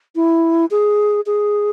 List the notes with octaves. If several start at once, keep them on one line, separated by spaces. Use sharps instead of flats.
E4
G#4
G#4